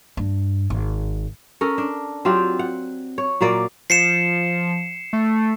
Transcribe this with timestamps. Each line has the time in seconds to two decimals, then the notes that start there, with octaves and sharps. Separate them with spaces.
0.17 G2
0.70 G#1
1.61 C#4 A4 A#4
1.78 D4
2.25 F#3 C4 F4 G4
2.59 F#5
3.18 C#5
3.41 A#2 F#3 A#3 D5
3.90 F3 C7 C#7 E7
5.13 A3